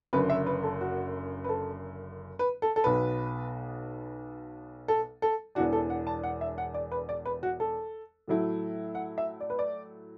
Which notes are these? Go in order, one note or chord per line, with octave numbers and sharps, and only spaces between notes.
F#1 F#2 D3 B4
E5
B4
A4
F#4
B4
A4
B4
A4
A4
B1 B2 B3 B4
A4
A4
E1 E2 E3 D4 F#4
A4
F#5
A5
F#5
E5
F#5
D5
B4
D5
B4
F#4
A4
A2 F#3 A3 E4
F#5
E5
D5
B4
D5